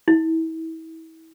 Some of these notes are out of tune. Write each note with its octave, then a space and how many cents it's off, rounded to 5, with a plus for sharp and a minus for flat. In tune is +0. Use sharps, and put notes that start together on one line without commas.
E4 -30